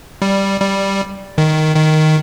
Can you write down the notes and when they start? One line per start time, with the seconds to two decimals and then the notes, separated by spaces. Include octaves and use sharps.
0.22 G3
0.60 G3
1.38 D#3
1.76 D#3